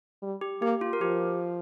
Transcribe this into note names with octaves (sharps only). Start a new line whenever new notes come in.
G3
G4
A#3 G4
F4
A#4
F3 G4